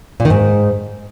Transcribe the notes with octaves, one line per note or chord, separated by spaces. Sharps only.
A#2
D#3
G#2